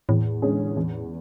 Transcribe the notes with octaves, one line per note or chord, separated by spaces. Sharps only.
E2 A2
D3 G#3 C#4 G#4
E2